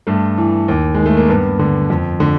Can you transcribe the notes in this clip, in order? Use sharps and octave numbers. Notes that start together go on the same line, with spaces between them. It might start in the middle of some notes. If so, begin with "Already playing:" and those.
G2 A3
E3
D#2
D#3 G#3
A3
A#3
G2 B3
D3
F2
D3